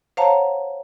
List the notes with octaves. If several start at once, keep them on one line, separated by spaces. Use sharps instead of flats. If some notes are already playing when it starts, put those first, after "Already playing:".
C5 C#5 F5 F#5 A5 A#5